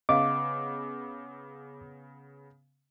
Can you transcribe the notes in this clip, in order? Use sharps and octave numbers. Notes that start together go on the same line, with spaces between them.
C#3 B3 D#5 F5 D6